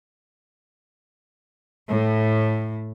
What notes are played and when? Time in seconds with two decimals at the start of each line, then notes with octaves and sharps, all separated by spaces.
1.89 A2